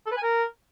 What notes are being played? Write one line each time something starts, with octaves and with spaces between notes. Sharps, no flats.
A4
B4
G#5
A#4